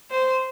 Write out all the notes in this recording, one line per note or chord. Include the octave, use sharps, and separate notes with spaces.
C5